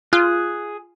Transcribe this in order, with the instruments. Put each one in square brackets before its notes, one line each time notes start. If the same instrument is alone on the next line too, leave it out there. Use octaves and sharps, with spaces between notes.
[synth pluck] F4 [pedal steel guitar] G#4 F#6